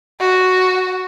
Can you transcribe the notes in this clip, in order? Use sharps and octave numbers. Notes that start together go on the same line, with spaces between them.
F#4